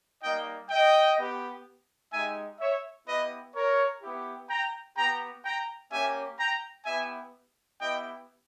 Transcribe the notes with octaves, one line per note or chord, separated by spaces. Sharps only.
G3 A#3 D#4 D#5 G5
D#5 G5
B3 G4
G#3 D#4 G4 E5 G#5
C#5 E5
B3 E4 G4 B4 D#5
A#4 C#5
B3 E4 G4
G5 A#5
B3 G4 G5 A#5
G5 A#5
A#3 C#4 G4 E5 G#5
G5 A#5
B3 E4 G4 E5 G#5
B3 E4 G4 D#5 G5